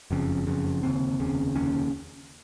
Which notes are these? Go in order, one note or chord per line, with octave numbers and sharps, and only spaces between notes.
F#1 F2 C#3
F#1 F2 C#3
F1 D#2 C#3 C4
F1 D#2 C#3
F1 D#2 C#3 C#4